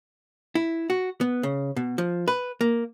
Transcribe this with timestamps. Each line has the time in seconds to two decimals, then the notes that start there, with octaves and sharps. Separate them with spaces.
0.55 E4
0.90 F#4
1.21 B3
1.43 C#3
1.76 B2
1.98 F3
2.28 B4
2.61 A#3